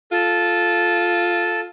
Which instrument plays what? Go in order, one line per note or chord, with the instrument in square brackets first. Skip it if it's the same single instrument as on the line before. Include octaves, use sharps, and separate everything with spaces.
[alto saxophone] F4 [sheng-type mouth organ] A4